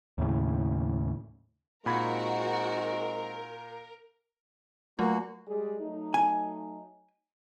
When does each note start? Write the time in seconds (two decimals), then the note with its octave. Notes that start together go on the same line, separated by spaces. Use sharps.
0.18 D#2 A2 C#3
1.86 A#2 G#3 C4 D#4 F#4 A#4 B5 G#6
4.99 F#3 A3 A#3 F4 F#4
5.48 G3 G#3 G#4
5.80 F#3 A3 D#4
6.14 G#5